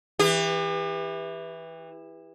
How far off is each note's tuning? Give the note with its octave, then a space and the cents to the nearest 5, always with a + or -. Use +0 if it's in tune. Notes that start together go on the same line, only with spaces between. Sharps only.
E3 +0 G4 +40